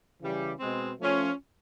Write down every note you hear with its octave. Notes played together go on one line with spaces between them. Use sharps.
C#3 E3 G3
B2 G#3 C4
F3 A3 C#4 F4